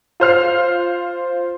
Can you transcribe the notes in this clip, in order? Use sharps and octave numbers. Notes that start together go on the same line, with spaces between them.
F4 C5 F6 C7